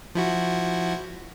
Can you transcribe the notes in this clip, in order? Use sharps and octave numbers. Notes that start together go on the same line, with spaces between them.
F3 E4 F#4